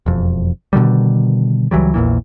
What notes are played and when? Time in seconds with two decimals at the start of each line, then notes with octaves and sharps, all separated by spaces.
0.06 E1 F2
0.73 B2 D3 D#3 G3
1.71 C#2 E3 F#3 G3
1.94 A#1 E2 A#2 E3